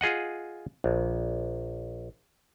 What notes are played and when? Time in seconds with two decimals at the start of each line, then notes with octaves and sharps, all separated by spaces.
0.01 F4 G#4 D#5 F#5
0.84 A#1